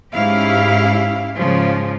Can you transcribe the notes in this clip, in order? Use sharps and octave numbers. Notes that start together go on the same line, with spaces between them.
G#2 C#4 E4 G4 F5
G#2 C#3 F3 C#4